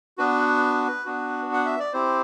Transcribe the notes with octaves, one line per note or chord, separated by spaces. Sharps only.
B3 D4 F#4 B4
B3 D4 F#4
F#5
E5
D5
C4 E4 G4 C5